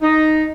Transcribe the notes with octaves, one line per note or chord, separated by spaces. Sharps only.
D#4